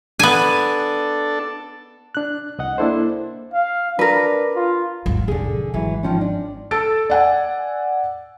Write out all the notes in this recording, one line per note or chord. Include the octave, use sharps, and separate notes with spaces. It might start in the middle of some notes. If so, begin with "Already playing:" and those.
B3 D4 A4 G#5
D4 F#6
C2 D#5 F#5
A#3 D4 E4 A4 C5
F5
D4 A#4 B4
F4
G#1 D#2 F#3
B1 F2 D3 G#4
G#1 E3 F#3
D#3 F3 C#4
D4
A4 E6 A6 D7
D5 F#5 G#5